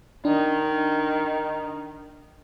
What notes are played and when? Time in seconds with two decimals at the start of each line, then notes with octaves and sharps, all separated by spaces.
0.25 D#3 D4